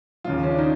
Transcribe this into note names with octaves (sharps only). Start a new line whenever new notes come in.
D#2 C#3 F3 F4
C#4
D4
D#4